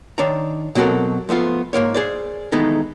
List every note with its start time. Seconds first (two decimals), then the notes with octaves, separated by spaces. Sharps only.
0.18 D#3 D4 C#5 A#5
0.75 B2 F#3 C4 F#4 A4 A#4
1.29 F3 A3 B3 F4
1.73 G#2 A#3 A#4 C#5
1.94 G#4 C5 D5
2.52 D#3 E3 G#3 A3 B3 D#4